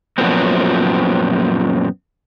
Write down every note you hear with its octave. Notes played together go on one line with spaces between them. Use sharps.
F#2 A#2 F3 F#3 B3 C4